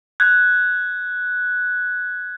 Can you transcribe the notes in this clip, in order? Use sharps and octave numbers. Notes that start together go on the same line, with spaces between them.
F#6 G#6